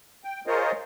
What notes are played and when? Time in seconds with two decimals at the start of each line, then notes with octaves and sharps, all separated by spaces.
0.24 G5
0.47 F4 G#4 A#4 C5 C#5 D#5